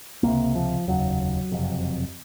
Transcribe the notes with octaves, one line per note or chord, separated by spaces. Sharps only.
C#2 C3 A#3
F3
F1 D#2 C#3 F#3
F#1 F2 C3